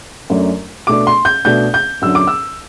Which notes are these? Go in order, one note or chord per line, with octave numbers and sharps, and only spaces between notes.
F#2 F#3 A3 D4
B2 A3 D4 D6
C6
G6
B2 A3 D4 G6
G6
F#2 D3 F#3 E6
D6
E6